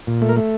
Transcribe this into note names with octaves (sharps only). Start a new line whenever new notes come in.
A#2
A3
A#4
A3